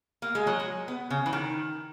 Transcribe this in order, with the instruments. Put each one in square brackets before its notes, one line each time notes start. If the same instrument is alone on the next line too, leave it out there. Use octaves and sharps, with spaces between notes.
[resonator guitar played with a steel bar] A#3
G#3
F#3
G#3
B3
C#3
E3
D#3